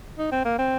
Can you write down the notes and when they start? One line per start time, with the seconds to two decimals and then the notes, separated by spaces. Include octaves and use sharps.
0.18 D#4
0.32 C4
0.45 A#3
0.59 C4